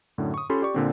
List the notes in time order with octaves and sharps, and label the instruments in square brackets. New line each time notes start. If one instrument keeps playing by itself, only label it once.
[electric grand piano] F#2 A2 D3
C#6 D#6
C#4 F4 G4 A4 B5 C6
G4 D5 C#6
A#2 D3 C4